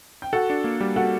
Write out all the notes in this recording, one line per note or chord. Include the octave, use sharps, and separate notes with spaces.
G5
F#4 A4 F#5
D4
A#3
G3
F#4 A4 F#5